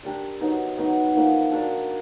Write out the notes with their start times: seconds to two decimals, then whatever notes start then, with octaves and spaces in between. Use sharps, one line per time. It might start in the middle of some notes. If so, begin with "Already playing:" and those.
0.03 D4 G4 A#4 D5
0.41 F#3 B3 D#4
0.77 F#3 B3 D#4
1.15 F3 A#3 D#4
1.52 D4 F#4 A#4 D5